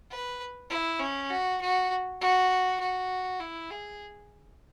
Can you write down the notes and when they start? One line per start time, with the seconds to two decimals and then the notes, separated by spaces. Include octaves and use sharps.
0.10 B4
0.70 E4
1.00 C#4
1.30 F#4
1.61 F#4
2.21 F#4
2.80 F#4
3.40 E4
3.71 G#4